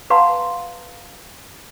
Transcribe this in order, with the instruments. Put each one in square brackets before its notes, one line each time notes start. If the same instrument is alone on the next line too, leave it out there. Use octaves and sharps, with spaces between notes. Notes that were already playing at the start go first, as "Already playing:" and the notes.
[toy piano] B4 F5 F#5 A5 A#5 C6